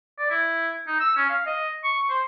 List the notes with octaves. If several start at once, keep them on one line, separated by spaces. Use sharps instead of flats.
D5
E4
D#4
E6
C#4
F5
D#5
C#6
C5